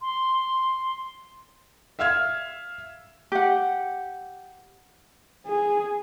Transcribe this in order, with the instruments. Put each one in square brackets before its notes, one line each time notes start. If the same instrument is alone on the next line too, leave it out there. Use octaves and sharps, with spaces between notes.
[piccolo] C6
[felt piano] E5 F5 E6 F6 G#6
[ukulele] G4 F#5
[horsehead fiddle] G#4